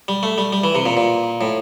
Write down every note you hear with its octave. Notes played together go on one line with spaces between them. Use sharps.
G3
A3
G3
G3
E3
C3
A#2
A#2
A2